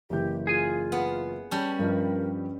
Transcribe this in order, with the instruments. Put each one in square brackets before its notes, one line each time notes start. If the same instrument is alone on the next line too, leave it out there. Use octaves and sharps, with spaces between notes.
[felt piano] F#1 E3 G6 [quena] G4
[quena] F4 [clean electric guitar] G#4 G#5
[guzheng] B3
[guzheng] G3 C#4 [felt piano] C#5 [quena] A5
[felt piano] G2 F3 D#5 [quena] A#4